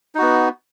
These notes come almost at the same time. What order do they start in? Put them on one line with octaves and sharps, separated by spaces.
D#4 F#4 B3